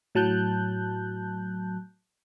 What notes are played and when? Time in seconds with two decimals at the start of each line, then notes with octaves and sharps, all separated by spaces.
0.15 A2 F#3 A5 F#6 G6